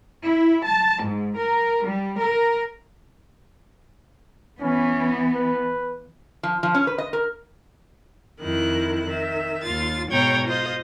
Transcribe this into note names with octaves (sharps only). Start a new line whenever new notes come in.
E4
A5
G#2
A#4
G3
A#4
E3 B3 C#4
B4
F3
F3
C#4
B4
D#5
A#4
F2 D#3 E4 F#6
D#3 E5
D#2 F4 A6
G#2 B2 C#5 G5 A#5 G#6
F4 C5 D#5